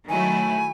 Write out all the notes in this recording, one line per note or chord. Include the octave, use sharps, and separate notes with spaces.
D#3 F#3 A3 E4 G#5